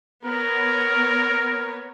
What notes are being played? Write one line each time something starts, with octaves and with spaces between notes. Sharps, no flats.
B3 A#4 C#5